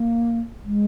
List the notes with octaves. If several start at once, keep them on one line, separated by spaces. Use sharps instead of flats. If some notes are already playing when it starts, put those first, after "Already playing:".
Already playing: A#3
G#3